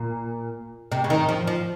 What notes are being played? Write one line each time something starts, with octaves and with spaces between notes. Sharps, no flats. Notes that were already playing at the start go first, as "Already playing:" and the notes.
Already playing: A#2
C3
C#3
D#3
F3
F3